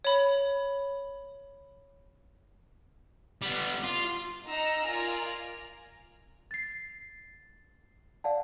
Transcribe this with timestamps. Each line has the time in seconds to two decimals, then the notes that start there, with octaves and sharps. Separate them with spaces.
0.05 C#5 B5
3.42 G3 B3
3.84 F4
4.47 D#4 D#5 F#5 A#5 E6
4.83 F4 A#4 D5 G#5 A#5 F6
6.51 A6 C7
8.24 D5 F5 F#5 A5